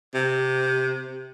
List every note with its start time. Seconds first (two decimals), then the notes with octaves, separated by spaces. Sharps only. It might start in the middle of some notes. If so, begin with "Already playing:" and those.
0.14 C3